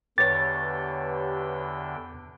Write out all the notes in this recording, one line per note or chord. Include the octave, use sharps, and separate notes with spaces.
E2 D3 G4 B4 C#5 G5 A6